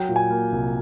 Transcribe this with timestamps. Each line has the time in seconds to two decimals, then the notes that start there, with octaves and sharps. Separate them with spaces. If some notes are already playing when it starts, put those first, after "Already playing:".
Already playing: F#3 G5
0.09 A#2
0.16 G#5
0.31 A#3
0.52 C2